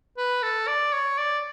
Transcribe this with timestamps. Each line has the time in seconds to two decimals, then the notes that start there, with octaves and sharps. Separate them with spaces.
0.18 B4
0.43 A4
0.68 D5
0.93 C#5
1.18 D5